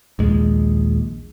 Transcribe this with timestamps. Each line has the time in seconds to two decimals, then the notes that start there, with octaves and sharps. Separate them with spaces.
0.19 A#1 D#2 G#3